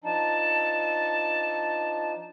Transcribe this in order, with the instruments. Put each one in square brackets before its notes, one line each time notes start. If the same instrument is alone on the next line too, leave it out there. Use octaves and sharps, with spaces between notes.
[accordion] F3 D4 D#4 [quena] A5